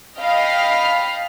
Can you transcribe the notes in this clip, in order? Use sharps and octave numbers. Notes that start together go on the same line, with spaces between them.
D#5 F5 G5 A5 B5 F6